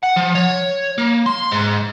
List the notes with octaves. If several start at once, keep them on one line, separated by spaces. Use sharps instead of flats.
F#5
F3
C#5
A#3
C6
G#2